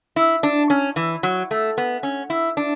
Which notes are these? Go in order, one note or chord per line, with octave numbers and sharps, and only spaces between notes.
E4
D4
C#4
E3
F#3
A3
B3
C#4
E4
D4